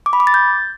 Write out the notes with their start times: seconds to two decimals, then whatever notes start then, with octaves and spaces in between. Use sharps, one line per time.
0.06 D6
0.13 B5
0.20 D6
0.27 A6
0.34 G6